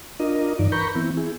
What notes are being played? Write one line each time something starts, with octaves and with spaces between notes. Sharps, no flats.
D4 F4 A#4 D#5
G2 E3 D#4 D5
A#4 B4 A#5 B5 C#6 G6
E3 B3 C4 E4
E4 G#4